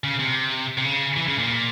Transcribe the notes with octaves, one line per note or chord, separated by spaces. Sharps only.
C#3
C3
C3
C#3
E3
C#3
A#2